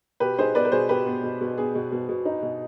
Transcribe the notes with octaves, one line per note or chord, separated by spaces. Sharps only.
B2 G4 B4
D#4 G#4 C5
B3 B4 D5
B4
B2 G#4 C5
B2 G4 B4
B3
B2
B2
B3 G#4
B2
B2
B2
D#4
B2